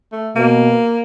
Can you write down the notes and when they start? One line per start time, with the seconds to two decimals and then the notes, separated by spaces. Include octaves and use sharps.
0.12 A3
0.36 B2 A#3